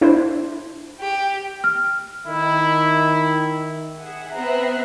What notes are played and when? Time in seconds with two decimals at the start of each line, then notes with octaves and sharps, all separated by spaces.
0.01 D4 E4 C5
1.01 G4
1.64 F6
2.27 D#3 E4
3.99 G#4 E5 F#5
4.35 B3 C4 E5 A#5 F#6 C7